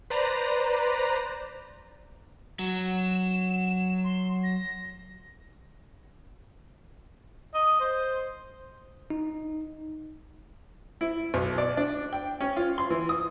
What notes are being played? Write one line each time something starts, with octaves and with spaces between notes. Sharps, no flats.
B4 C5 D5 A#5
F#3 E7
C6
A#6
D#5
C5
D#4
E4
B1
D5
D4
G5
C#4
F4
C6
E3
D#6